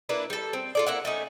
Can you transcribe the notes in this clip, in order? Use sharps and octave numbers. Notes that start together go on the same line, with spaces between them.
A#3 D4 E4 B4
G3 A4
C4
F4 A4 D5
A#3 E4 F#5
A3 C#4 D#4